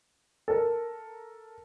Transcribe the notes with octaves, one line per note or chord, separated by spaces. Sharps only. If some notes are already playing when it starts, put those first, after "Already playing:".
A4 A#4